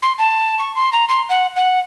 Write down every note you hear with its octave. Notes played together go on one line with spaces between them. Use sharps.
C6
A5
C#6
C6
A#5
C6
F#5
F#5